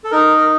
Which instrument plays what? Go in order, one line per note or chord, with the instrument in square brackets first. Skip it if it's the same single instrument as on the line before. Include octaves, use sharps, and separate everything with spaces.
[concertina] A4
D#4 A#4
A#4